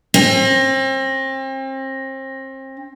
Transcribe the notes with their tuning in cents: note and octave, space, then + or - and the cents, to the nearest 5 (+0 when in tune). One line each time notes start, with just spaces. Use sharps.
C4 +35